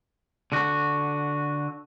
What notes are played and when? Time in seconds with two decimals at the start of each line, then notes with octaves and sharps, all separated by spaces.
0.52 D3 F#4